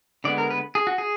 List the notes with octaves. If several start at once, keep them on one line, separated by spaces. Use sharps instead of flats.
D3 G#3 B3 D5
A#4
B4
G#4
F#4
G#4